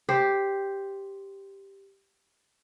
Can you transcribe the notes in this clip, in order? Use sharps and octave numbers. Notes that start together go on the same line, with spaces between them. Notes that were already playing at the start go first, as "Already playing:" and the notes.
G4 C5